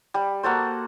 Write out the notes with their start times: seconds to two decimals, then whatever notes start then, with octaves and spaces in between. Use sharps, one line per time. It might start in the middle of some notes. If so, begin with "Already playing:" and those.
0.14 G3
0.43 A#3 F#4 A4 C5